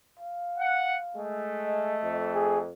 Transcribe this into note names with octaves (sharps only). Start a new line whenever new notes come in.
F5
F#5
G#3 A3
D#5
F2
G#4